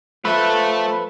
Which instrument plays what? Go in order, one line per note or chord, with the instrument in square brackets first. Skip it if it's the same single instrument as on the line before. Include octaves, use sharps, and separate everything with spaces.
[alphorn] F3 [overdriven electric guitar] A3 E5 [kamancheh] A4 [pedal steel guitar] B4